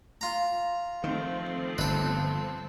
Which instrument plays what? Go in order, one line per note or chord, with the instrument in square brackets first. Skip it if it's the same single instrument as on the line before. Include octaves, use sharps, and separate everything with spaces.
[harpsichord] F4 A#5
[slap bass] D#3 [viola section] F3 A3 C4
[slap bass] G1 [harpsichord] A4 B4